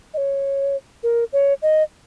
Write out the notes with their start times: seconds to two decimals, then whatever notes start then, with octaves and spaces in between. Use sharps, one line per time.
0.14 D#5
0.17 C#5
1.03 A#4
1.33 C#5
1.62 D#5